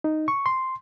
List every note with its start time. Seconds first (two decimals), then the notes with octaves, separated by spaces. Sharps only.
0.04 D#4
0.28 C#6
0.46 C6